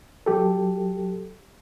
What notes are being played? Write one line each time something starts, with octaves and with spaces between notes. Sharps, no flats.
F#3 G4 A4